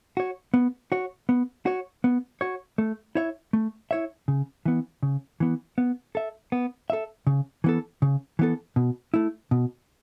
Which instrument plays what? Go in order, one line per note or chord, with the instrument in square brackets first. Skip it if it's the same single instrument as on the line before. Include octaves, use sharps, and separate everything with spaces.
[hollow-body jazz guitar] F#4 C#5
B3
F#4 C#5
B3
F#4 C#5
B3
F#4 C#5
A3
E4 C#5 E5
A3
E4 C#5 E5
C#3
E3 B3
C#3
E3 B3
B3
A4 E5
B3
A4 E5
C#3
E3 B3 A4
C#3
E3 B3 A4
B2
A3 E4
B2